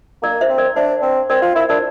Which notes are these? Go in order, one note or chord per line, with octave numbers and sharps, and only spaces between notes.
A#3 A#4 D5
C5 E5
C4
A#4 D5
D4 C5 E5
C4
C4 A#4 D5
F4 C5
E4 A#4 D5
D4 A#4 D5